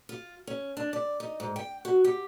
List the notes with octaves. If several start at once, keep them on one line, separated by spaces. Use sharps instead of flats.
F4
C#4
D4
D5
D#4
G#2
G5
F#4
G4